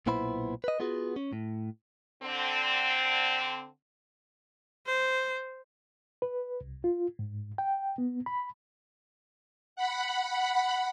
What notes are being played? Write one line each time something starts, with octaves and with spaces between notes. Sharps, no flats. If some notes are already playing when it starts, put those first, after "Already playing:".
B1 A#2 B3 E4 C5 B5
B4 D#5
B3 F4 F#4 G#4
C#4
A2
D3 C4
C5
B4
C2
F4
G#2
G5
B3
B5
F#5 B5